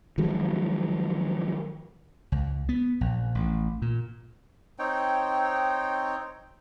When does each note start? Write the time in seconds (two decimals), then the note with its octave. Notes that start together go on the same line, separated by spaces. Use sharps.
0.18 D#3 F3 F#3 G#3
2.32 C#2
2.69 B3
3.01 A#1
3.35 A1
3.82 A#2
4.79 C4 D#4 C#5 G5